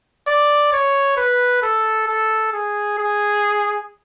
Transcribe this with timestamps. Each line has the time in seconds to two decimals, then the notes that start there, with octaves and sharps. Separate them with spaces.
0.28 D5
0.73 C#5
1.17 B4
1.63 A4
2.08 A4
2.53 G#4
2.98 G#4